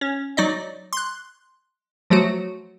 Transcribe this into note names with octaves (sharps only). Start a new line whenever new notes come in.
C#4
F#3 D#4 D5 D#5
C6 F#6
F3 F#3 A3 F#4